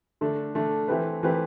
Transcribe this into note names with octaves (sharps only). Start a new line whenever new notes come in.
D3 A3 D4
D3 A3 D4
E3 A3 C4 G4 B4
E3 A3 C4 G4 B4